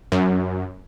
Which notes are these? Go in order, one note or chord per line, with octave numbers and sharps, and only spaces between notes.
F#2